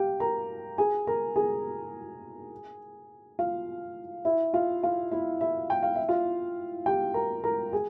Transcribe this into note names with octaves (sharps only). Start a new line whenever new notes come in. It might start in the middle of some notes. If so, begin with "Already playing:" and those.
Already playing: G4 F5 G5
A#4 A#5
G#4 G#5
A#4 A#5
G#4 G#5
F4 F5
E4 E5
F4 F5
F4 F5
E4 E5
E4 E5
G5
F5
E5
F4 F5
G4 G5
A#4 A#5
A#4 A#5
G#4 G#5